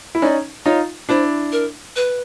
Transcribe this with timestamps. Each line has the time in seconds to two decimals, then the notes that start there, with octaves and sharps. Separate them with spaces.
0.15 E4
0.22 C#4 D#4 D5
0.65 D#4 F4 C#5
1.09 D4 E4 C5
1.52 A#4
1.96 B4